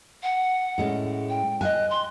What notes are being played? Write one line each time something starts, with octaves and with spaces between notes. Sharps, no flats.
F#5
A2 G#3 C#4
G5
D#5 F5 G#5 F#6
C6